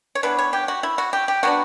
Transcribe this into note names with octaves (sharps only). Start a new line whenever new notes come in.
C#5
E3 B3 D4 B4
C#5
G4
F#4
E4
F#4
G4
G4
F#3 B3 D4 F#4